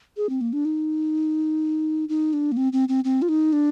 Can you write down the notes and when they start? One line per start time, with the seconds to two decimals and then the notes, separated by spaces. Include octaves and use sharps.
0.17 G#4
0.29 C4
0.41 A#3
0.53 D4
0.65 D#4
2.09 D#4
2.33 D4
2.52 A#3
2.57 C4
2.73 C4
2.89 C4
3.04 C4
3.22 F4
3.29 D#4
3.53 D4